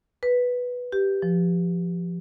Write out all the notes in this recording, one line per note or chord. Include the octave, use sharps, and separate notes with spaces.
B4
G4
F3